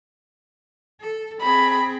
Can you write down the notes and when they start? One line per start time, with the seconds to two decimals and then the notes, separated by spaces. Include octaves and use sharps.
1.01 A4
1.41 C4 G#4 B5